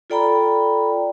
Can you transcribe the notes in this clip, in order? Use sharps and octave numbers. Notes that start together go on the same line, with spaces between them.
F4 A4 D5 G5 A#5 B5